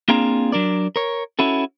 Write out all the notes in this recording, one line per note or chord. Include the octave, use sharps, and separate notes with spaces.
A#3 C4 D4 F4 G#4 A#5
F#3 D4 A#4 D5
A#4 C#5
C#4 E4 F#4 A4